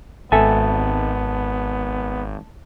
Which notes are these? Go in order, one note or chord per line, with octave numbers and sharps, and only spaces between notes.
G#1 B3 A4 E5 G#5 A5